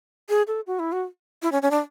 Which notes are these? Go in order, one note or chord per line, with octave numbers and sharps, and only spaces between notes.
G#4
A4
F#4
E4
F#4
E4
C#4
C#4
D4